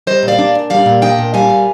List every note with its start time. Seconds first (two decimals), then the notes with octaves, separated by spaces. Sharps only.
0.07 G3 C5 D#5
0.23 A#2
0.28 D5 F5
0.39 D4
0.55 A#2
0.70 G3 D5 F5
0.86 A#2
1.02 D4 D#5 G5
1.19 A#2
1.34 G3 F5 G#5
1.50 A#2